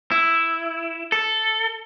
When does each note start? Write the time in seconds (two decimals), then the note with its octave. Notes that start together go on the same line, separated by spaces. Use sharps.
0.11 E4
1.12 A4